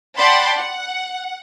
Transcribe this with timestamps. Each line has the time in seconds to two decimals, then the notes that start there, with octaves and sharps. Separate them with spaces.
0.17 D5 F#5 G5 A5 B5 C6
0.57 F#5